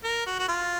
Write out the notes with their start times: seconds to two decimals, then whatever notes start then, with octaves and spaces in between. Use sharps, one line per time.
0.04 A#4
0.26 F#4
0.39 F#4
0.48 F4